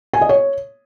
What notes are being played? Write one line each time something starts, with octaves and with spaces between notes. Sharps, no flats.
G#5
D#5
C#5